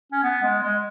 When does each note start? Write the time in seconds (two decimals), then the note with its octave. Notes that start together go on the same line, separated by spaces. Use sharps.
0.12 C#4
0.23 B3
0.43 G#3
0.62 G#3